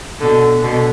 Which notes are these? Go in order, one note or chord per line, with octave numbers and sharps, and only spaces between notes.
B2 D3
B2 D3